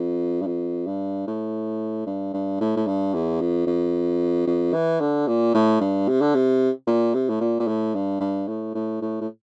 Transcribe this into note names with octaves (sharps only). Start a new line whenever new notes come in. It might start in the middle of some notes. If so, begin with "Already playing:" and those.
Already playing: F2
G2
F2
G2
A2
G2
G2
A2
A2
G2
E2
F2
F2
F2
E3
D3
A#2
A2
G2
C3
D3
C3
A#2
C3
A2
A#2
A#2
A2
G2
G2
A2
A2
A2
A2